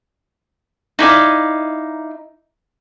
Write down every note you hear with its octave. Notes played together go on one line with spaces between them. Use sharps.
D#4 E4 D5 F5